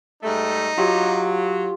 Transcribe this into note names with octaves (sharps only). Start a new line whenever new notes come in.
G#2 G3 A3 D#4
F#3 F4 G4